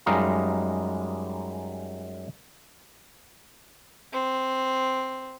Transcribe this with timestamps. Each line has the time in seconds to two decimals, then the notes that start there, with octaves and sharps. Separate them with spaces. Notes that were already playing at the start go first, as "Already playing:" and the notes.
0.06 F#2 G3 G#3 D#4 F5 A#5
4.12 C4